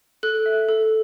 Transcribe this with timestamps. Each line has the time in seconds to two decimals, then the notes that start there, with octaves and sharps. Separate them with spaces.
0.23 A4 F#6
0.46 E5
0.69 A4